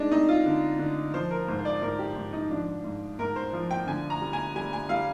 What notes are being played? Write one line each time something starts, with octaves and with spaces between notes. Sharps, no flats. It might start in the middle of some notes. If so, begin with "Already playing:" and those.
Already playing: G#3 D4 D#4
C4 D#4
F4
D3
D3
F3 C5
A#4
G#2 C5
C5
D5
G#2 A#4
G4
G#2
D#4
F3 D4
G#2
G#2 A#4
C5
F3
G5
D3 G#5
A#5
G3
G#5
G3 G#5
G#5
G3 F5